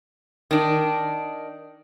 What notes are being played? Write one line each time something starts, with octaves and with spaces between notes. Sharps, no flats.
D#3 D4